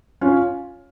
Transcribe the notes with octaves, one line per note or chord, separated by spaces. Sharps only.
C#4 F4